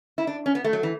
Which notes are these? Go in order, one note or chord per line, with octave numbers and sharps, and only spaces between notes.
E4
D4
C#4
B3
A3
F#3
E3